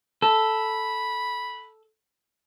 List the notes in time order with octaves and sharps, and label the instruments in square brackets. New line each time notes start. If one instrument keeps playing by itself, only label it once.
[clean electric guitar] A4 [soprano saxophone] B5